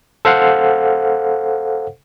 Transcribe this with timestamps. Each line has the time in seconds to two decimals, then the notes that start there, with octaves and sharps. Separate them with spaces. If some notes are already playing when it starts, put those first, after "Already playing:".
0.25 A4 C5 F5 F#5